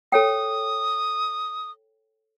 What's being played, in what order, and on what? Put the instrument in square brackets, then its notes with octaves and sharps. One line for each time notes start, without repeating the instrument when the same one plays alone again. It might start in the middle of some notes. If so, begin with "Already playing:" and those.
[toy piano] A4 C#5 G5 [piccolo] D#6